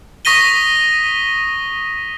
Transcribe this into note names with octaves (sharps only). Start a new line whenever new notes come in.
C#6 D#6 A#6 B6 D#7 G7